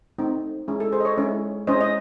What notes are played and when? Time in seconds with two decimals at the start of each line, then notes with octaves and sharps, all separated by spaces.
0.18 A3 C4 D#4
0.68 G#3 C#4 E4 G#4
0.80 A4
0.92 G#4 C5
1.00 D#5
1.05 A4 C#5
1.18 G#3 C#4 E4
1.67 G#3 C#4 E4 C5 D#5
1.81 D#5